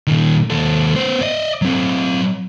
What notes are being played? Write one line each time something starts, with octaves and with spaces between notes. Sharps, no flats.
A#2 D#3
D#2 A4
B3 C5
D5 D#5
F#3 C4